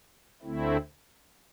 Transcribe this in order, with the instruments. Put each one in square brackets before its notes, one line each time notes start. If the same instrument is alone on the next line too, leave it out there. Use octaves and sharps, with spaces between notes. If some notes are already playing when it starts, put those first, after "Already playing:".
[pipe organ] D2 D3 A3 C4 E4